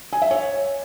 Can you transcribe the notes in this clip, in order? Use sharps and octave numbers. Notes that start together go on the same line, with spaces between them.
G#5
E5
C#5